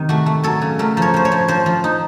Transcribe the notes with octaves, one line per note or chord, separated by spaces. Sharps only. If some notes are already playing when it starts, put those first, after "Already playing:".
Already playing: C3 D#3 D#4
A3 F#4
A3
F#3 A4
C#3
A3 A#4
F3
C#5
F3 C5
C#5
F3
F3 C5
F3
D#4